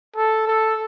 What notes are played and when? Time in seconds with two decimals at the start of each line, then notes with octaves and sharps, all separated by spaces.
0.16 A4
0.47 A4